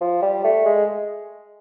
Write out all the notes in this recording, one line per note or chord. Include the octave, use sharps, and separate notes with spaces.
F3
G3
A3
G#3